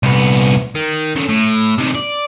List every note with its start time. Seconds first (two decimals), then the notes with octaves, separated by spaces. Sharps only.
0.03 C2 B3
0.75 D#3
1.16 C#3 A4
1.29 A2
1.78 C3 D#3
1.95 D5